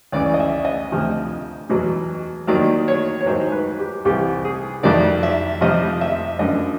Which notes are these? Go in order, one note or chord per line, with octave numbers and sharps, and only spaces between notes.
C#2 C#3 E3 D5
D#5
E5
D#5
D2 C3 F3
E2 B2 F#3
D#2 D#3 F#3 D5
C#5
C#5
G#2 D#3 F#3 C5
B4
G4
C2 C3 E3 G4
G#4
F2 C3 D#3 F#3 D5
E5
F2 C3 F3 D#5
E5
F#2 D3 F3 D#5